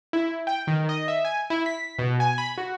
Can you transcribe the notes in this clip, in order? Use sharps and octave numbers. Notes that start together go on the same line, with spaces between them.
E4
G5
D#3
D#5
E5
G#5
E4
B6
B2
G#5
B5
F#4